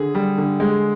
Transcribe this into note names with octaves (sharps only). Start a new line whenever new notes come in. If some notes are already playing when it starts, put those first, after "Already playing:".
Already playing: D3 G#4
G3
D3
G#3